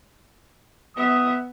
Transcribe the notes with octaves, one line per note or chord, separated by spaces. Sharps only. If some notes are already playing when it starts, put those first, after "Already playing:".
B3 E5 D#6